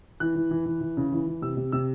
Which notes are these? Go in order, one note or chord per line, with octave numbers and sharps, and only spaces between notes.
E3 F#6
E3
E3
E3
E3
C#3
E3
E3
C3 E6
C3
C3 E6